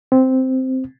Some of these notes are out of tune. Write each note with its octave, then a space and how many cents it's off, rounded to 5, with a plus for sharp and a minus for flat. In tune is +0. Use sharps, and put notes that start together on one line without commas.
C4 -5